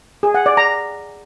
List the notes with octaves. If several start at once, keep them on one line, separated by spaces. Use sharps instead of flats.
G#4
F#5
D5
A#5